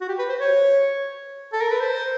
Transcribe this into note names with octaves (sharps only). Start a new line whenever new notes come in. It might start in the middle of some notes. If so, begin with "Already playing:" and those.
F#4
G4
B4
C5
C#5
A4
A#4
B4
C5